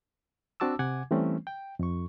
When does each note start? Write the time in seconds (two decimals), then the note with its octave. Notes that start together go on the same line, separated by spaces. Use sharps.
0.60 C4 D4 F#4 A5 D6 E6
0.79 C3 F#5 G#5 D6 G#6
1.11 E3 G3 A3 C4 C#4
1.47 G5
1.79 F2 C#6